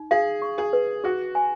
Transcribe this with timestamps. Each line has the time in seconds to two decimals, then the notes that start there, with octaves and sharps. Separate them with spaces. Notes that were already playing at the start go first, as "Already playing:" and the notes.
Already playing: D#4
0.11 G#4 F5
0.42 C#6
0.58 G#4
0.73 B4
1.04 F#4 G#4
1.35 G#5